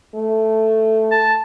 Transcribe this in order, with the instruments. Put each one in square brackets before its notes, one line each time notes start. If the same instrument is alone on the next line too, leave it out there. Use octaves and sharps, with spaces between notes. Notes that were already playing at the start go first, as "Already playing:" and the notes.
[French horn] A3
[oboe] A5